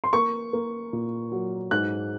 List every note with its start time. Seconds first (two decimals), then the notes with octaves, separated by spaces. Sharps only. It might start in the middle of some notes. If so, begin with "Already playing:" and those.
0.04 C6
0.13 A#3 C#6
0.53 A#3
0.93 A#2
1.32 F#3
1.71 G#2 F#6